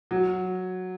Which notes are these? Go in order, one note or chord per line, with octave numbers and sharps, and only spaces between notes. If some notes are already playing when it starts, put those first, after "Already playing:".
F#3